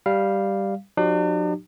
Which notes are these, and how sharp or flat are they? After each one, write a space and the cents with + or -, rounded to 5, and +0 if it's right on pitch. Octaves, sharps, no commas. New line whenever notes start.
G3 +0 F5 -5
F#3 -45 D4 +45 G4 -30